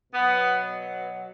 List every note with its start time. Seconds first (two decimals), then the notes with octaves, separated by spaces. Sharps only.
0.13 B2 F#3 B3